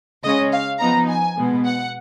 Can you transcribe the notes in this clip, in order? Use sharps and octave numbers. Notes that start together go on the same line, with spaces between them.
C#3 G#3 C#4 D#5
F5
F3 B3 D#4 A#5
G#5
B2 G#3 B3
F#5